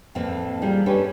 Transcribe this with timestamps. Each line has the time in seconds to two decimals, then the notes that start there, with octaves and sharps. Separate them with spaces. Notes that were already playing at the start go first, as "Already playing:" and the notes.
0.15 F2 A2 E3 A#3 C4 A4
0.62 G3 F4 G#4 A#4
0.86 C#4 D4 G4 A4 B4